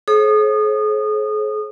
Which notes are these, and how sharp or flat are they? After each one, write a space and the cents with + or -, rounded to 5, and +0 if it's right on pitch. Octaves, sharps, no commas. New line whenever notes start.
G#4 +45 C5 +45 D#6 -25